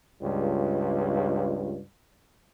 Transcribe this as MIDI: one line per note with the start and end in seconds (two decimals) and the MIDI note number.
0.22 1.79 37
0.22 1.79 43